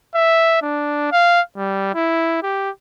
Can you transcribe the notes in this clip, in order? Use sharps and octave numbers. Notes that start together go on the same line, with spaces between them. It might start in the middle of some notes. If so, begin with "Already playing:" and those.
E5
D4
F5
G3
E4
G4